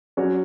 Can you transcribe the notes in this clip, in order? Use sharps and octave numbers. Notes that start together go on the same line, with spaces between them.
F#3 C#4 F#4 C#5